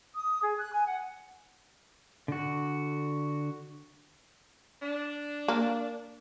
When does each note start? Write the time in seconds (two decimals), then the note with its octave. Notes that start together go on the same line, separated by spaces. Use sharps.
0.14 D#6
0.43 G#4
0.59 F#6
0.73 G#5
0.87 F#5
2.28 D3 F#4
4.82 D4
5.48 A#3